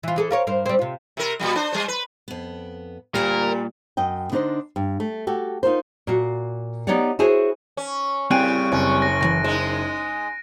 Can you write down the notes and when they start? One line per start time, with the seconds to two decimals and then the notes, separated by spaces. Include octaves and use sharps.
0.03 E3 F4
0.16 E3 G#4 A4
0.31 F4 A#4 C#5
0.47 G2 A#4 C5
0.66 G3 C4
0.79 C3 F4
1.17 C3 A#4
1.40 A#2 C#3 G3
1.55 D4 C5
1.72 G3 C5
1.88 B4
2.28 F2 B3
3.14 D2 A#2 G3 F4 A#4 G#5
3.97 F#2 D#5 G5
4.32 D3 D4 D#4 A4 C5 D#5
4.76 G2
5.00 A3
5.27 F#4 G4 A4
5.63 D#4 F4 A#4 C5
6.07 A#2 F4 F#4
6.87 B3 D#4 G4 C#5 D5 F#5
7.19 E4 F#4 G#4 C5 C#5
7.77 C#4
8.31 A2 C#3 G3 C4 G#5 F#6 D7 D#7
8.72 F#1 C#4
9.02 A#6
9.21 C2 E3 A#6
9.44 G#3 D#4 C5